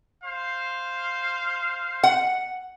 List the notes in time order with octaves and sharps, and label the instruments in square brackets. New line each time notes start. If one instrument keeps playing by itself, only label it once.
[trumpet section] C5 F5
[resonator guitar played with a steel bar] F#5